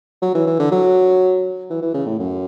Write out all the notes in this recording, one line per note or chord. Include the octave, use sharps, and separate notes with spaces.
F#3
E3
E3
D3
F#3
E3
E3
C#3
A2
F#2